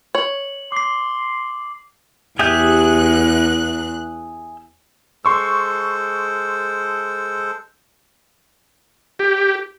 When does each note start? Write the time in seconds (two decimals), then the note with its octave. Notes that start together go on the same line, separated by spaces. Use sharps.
0.15 C#5 F#7
0.72 C6 D6 C7
2.39 E2 G4 G#4 E5 F#6 G6
5.25 G#3 A4 C5 C6 C#6 E6
9.19 G4